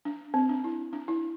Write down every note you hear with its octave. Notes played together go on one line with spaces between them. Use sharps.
D4
C4
D4
E4
D4
E4